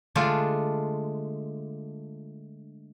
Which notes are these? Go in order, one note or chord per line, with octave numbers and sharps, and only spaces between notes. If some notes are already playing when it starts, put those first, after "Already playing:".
D3 G#3 A3 D4 F4